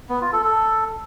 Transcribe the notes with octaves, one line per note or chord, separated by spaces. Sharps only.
B3
F4
A4
A4